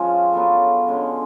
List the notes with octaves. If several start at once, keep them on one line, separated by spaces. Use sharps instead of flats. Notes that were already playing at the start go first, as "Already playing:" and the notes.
Already playing: F3 G#3 C#4 F4
F#3 B3 F4 A4
D3 G#3 C#4